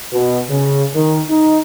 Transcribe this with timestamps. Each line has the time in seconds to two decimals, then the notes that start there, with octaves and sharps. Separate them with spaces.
0.12 B2
0.50 C#3
0.94 D#3
1.29 D#4